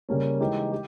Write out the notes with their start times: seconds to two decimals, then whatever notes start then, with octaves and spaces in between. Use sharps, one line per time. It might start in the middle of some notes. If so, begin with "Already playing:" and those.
0.09 C#3 G3 A#3 C#4
0.40 E3 G#3 D#4 G4
0.72 G4